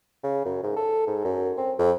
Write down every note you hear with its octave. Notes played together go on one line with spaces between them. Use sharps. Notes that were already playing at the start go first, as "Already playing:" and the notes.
C#3
F#2
G#2
A4
G#2
F#2
C4
F2